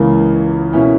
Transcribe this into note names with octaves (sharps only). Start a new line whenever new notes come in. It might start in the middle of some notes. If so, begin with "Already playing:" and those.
Already playing: C#2 C#3 E3 A#3
B2 A#3 C#4 E4